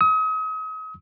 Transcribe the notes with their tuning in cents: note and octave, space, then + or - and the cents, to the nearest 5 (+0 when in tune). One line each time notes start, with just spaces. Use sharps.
D#6 +40